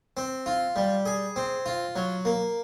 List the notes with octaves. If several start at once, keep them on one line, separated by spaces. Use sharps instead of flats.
C4
F4
G3
G#4
C4
F4
F#3
A#3